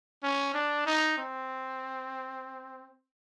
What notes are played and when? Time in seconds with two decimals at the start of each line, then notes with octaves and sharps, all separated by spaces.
0.24 C#4
0.54 D4
0.86 D#4
1.18 C4